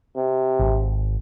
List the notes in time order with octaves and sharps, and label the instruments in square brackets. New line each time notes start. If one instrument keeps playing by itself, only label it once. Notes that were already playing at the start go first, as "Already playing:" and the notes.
[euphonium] C3
[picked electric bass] G#1